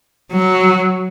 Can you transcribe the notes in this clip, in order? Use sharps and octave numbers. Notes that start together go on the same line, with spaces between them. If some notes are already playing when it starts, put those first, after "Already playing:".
F#3